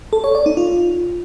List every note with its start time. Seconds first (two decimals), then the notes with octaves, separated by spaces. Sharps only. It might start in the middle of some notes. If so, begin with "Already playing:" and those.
0.13 A4
0.24 C#5
0.35 D5
0.46 D#4
0.57 F4